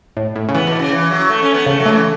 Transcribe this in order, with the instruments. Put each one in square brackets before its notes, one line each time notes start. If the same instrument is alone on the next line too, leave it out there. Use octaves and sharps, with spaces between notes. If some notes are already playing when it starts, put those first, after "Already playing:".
[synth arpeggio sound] A2
A2
C#3
[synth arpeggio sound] E3 [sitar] B3
[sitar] B2
C#3
E3
F#3
A3
C#4
B3
[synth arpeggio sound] C#3 [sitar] A3
[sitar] F#3
[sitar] C#3 [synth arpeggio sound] A3
[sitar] E3